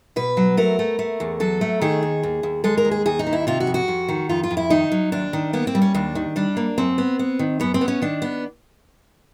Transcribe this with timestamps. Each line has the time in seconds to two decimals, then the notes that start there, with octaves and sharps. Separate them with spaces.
0.16 B2 B4
0.37 F#3
0.57 A3 A#4
0.79 A3
0.99 A3
1.20 E2
1.40 F#3 A4
1.61 A3
1.81 D#3 G#4
2.03 D#2
2.23 D#2
2.43 D#2
2.64 G#3 A4
2.78 A#4
2.85 D#2
2.91 G#4
3.06 D#2 G#4
3.19 D#4
3.27 D#3
3.33 E4
3.47 C3 F4
3.60 F#4
3.67 F2
3.74 F#4
3.88 F2
4.09 D#3
4.29 F2 F4
4.43 F4
4.51 F2
4.57 E4
4.70 D#3 D#4
4.92 F#3
5.12 D#2 D4
5.33 D#3
5.53 A#3 B3
5.67 C4
5.75 G3
5.82 C#4
5.94 D#2 D4
6.15 D#3
6.36 G3 D4
6.57 A#3
6.78 F#2 C4
6.98 B3
7.19 B3
7.39 D#3
7.60 F#2 B3
7.74 C4
7.81 B3
7.88 C#4
8.02 D#3 D4
8.22 B3